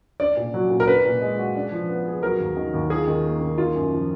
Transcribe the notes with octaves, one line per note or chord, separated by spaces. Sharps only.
D4 D5
A#2
F#3
A#2
A#4
D4 B4
A#2
G#3
F#4
D4
F3
B3
G#4
F#3 A#4
D#2
D#3
D#2
F4 G#4
D#3
A#3
D#3
A#3 F4
F#2
F3